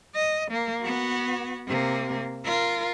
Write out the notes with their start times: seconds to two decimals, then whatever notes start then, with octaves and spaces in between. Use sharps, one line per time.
0.15 D#5
0.52 A#3
0.82 B3 F#4
1.67 C3 A#3
2.45 F4 A#4